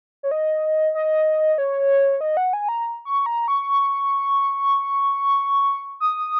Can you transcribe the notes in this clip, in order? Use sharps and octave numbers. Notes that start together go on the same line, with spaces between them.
C#5
D#5
D#5
C#5
D#5
F#5
G#5
A#5
C#6
A#5
C#6
D#6